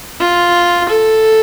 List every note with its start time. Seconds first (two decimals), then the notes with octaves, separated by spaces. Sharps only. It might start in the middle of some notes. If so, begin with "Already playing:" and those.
0.20 F4
0.89 A4